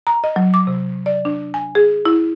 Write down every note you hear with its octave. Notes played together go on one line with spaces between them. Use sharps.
A#5
D#5
F#3
D6
C3
D5
D4
G#5
G#4
E4